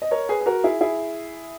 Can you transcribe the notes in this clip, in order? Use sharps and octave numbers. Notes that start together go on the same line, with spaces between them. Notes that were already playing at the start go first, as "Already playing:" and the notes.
D#5
A#4 C#5
G#4 B4
G#4
F#4 A#4
E4 G#4
E4 G#4